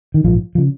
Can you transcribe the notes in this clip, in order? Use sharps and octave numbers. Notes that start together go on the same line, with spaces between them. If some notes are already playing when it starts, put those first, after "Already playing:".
D#3
A#1 G#2 F3
F3
C#3